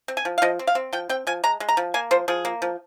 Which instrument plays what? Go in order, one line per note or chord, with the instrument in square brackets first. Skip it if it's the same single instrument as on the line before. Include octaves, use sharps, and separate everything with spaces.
[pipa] C4
G#5
F3
F5
F3 D#5
C4
F5
C4
F3 G5
C4 G5
F3 G#5
G#3 A#5
G#3
A#5
F3
A#3 G#5
F3 C5
F3 G#4
A#3
F3